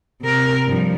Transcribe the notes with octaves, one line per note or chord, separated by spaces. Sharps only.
C3 A#4
G2 F3